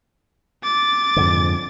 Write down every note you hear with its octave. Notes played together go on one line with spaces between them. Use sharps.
D6 A6
F2 G#2 D3